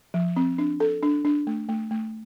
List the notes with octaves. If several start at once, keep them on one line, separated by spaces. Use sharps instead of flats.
F3
C4
D4
A4
D4
D4
A3
A3
A3